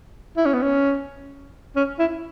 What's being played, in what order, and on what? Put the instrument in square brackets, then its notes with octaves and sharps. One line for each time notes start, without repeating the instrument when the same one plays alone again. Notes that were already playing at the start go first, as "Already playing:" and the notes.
[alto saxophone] E4
C#4
B3
C#4
C#4
E4